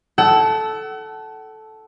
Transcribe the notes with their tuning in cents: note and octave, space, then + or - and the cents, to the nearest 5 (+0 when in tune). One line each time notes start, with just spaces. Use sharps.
A4 -10 F#5 +35 E6 +0